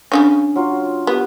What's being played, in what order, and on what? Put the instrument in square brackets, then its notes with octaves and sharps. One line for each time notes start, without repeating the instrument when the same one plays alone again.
[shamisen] C#3 E3 C#4 [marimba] D4
[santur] F#3 F4
[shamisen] B3 [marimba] G4